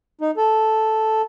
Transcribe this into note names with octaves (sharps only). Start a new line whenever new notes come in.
D#4
A4